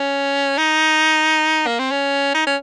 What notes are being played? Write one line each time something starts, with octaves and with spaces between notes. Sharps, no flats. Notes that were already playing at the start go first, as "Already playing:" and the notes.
Already playing: C#4
D#4
A#3
C4
C#4
D#4
C#4